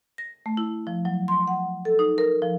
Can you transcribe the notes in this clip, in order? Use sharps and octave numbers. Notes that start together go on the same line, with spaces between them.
A#6
A3
E4
F3
F#3
C6
F#5
A4
D#4
A#4
F3